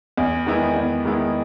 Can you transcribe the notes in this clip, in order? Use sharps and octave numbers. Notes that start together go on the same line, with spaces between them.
E2
D#3 G#3 B3 E4
E2
D#3 G#3 B3 E4